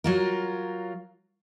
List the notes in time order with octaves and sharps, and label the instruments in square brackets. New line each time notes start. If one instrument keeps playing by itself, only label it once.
[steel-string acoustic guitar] F#3 F4 A#4